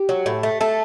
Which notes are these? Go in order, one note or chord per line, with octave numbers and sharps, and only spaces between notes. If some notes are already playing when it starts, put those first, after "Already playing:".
Already playing: G4
F#3
A2
A3
A3 A4